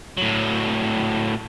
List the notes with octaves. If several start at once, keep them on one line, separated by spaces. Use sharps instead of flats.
A2 F#3